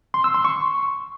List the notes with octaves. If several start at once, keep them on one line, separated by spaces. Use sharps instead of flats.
C6
E6
C6
C#6